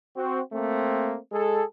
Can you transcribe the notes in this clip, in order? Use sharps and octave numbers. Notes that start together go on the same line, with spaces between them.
C4 F#4
A3 A#3 C4
G#3 G#4 A4